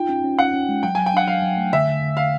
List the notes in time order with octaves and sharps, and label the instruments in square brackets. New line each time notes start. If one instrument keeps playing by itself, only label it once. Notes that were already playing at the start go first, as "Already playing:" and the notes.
Already playing: [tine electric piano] D#4 F4 [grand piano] G5
[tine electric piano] C#4
C#4
[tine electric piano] C#4 [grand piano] F#5
[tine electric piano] C#4
G#3
[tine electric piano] F#3 [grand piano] G5
[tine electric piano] F#3 [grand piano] G#5
[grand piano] G5
[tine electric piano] D4 [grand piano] F#5
[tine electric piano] F#3 [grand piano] F5
[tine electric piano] F#3
A3
[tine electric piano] D3 [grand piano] E5
[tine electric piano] D3
D3
[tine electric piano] D3 [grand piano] F5